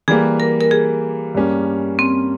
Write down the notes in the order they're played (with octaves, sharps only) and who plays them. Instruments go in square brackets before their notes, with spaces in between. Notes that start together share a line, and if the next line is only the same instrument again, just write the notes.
[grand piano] E3 G3 A#3 [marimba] G#4
[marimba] A#4
A#4
G#4
[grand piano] G2 G3 A#3 C#4
[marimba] C4